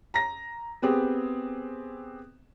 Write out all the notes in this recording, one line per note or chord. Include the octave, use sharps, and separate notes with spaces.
A#5 A#6
B3 C4 G4 G#4